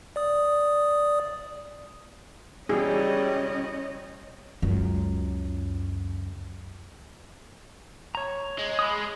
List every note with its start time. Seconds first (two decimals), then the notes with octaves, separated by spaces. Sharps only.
0.16 D5 D#6
2.69 C#2 B2 E3 G3 C#4 G#4 D#5
4.62 C#2 F#2
8.15 C#5 A#5
8.59 G#3
8.79 B5 D#6